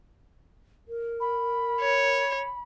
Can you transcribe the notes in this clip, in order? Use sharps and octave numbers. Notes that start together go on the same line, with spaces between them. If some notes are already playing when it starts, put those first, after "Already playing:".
A#4
B5
C#5